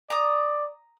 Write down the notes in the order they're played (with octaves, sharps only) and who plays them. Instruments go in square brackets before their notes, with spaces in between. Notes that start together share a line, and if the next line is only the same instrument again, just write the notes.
[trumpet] D5 [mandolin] A#5 D#6